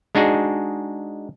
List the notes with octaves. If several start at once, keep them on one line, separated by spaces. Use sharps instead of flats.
G#3 D4 D#4 F#4 G#4